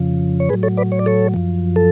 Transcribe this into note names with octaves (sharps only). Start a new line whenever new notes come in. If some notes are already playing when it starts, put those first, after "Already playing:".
Already playing: F2 C#3 F3
C#5
A2 F#3 G#4 B4
A4 C#5
B4 D5
C#5
D5
A4 C#5
F#2 F3
A4